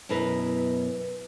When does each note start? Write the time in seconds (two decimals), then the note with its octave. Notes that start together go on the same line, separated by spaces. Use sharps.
0.09 F#2 B2 E4 A#4 B4